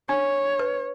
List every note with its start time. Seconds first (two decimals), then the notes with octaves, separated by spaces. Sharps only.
0.09 D4 C#5
0.59 B4